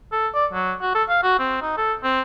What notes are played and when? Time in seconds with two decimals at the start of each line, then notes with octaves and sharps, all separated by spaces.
0.12 A4
0.35 D5
0.53 F#3
0.82 F#4
0.95 A4
1.09 F5
1.23 F#4
1.39 C4
1.62 D#4
1.77 A4
2.04 C4